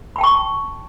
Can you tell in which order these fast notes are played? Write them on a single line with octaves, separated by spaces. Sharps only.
B5 G5 A5 C#6